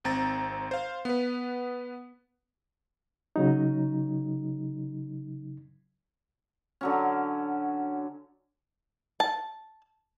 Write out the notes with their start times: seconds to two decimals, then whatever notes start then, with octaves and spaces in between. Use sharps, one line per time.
0.04 G#1 C4 A#5 A6
0.71 C5 F5
1.05 B3 B4
3.36 C#3 F#3 D#4
6.81 D3 F#3 C#4
9.20 A5